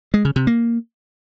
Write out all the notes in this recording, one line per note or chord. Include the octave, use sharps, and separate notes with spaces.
G#3
C#3
C3
A#3